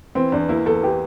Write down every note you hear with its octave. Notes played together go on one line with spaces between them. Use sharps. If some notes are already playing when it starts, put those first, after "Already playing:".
E3 C4
E2 D4
A#3 E4
E2 A4
E3 G4